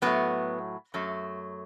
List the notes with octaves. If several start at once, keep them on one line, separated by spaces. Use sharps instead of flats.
A2 F#3 A3 B3
F#2 F#3 A3